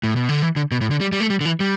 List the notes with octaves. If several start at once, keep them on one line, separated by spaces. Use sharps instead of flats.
A2
B2
D3
E3
D3
B2
A2
D3
G3
G3
A3
G3
D3
E3
G3